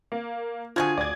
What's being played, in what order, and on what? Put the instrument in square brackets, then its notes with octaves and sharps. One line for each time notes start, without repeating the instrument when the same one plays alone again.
[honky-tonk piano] A#3
[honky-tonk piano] D3 G#6 [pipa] F3 F#4 G#4 [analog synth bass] F4
[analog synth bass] D2 [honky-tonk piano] D5 G#6